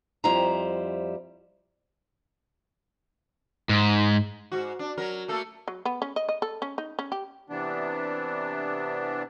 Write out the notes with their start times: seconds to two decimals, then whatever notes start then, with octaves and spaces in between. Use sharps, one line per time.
0.24 F2 G3 E4 C5 A#5
3.69 G#2
4.52 G#2 F#4
4.79 D4
4.98 F#3 A#4
5.28 A3 A#3 A4
5.68 F#3
5.85 B3
6.02 C#4
6.16 D#5
6.29 D#5
6.42 A4
6.62 C#4
6.78 D#4
6.99 C#4
7.12 G4
7.50 C3 E3 B3 D4